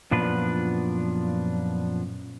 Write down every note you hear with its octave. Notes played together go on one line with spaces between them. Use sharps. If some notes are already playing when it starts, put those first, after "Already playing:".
F#2 A#2 F3 B3 D4 B4